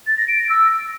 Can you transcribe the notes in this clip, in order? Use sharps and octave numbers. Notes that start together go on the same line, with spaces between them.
A6
A#6
D7
A#6
E6